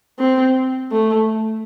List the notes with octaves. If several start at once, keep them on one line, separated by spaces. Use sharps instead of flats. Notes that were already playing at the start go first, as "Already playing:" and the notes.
C4
A3